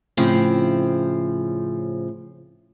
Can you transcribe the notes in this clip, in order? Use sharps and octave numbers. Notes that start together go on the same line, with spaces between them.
A2 C#3 F3 C4